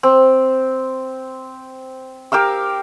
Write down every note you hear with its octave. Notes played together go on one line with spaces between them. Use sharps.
C4
G4 A#4 F5 E6